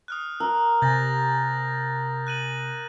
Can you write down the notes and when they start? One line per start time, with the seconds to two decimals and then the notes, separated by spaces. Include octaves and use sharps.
0.08 D#6 F6 F#6
0.40 A#4 E6
0.82 C3 G#5 G6 A6 A#6
2.27 F#6 D#7 F#7